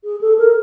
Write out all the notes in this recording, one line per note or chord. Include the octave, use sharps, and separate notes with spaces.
G#4
A4
A#4